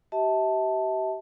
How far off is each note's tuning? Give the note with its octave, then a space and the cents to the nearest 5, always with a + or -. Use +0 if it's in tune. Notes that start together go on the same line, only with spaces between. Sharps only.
G4 -30 E5 -35 A5 +0